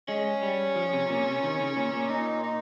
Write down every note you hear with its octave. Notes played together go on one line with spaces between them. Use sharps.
G#3 C#4
G3
F3
C3
A#2
C3
D#3
C#3
A#2
A#2
D#4
D#4